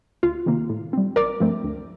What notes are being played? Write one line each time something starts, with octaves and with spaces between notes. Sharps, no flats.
D2 F4
C3 D#3 A#3
A2
G3 C4
A1 A#4 D5
G2 F3 A3 C4
D2